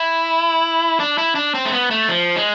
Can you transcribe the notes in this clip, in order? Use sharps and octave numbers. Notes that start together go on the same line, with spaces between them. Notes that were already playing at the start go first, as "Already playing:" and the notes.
Already playing: E4
D4
E4
D4
C4
A3
B3
A3
F3
G#3